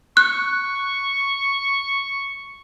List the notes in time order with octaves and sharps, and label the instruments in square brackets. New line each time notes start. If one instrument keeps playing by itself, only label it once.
[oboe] C#6 [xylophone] F#6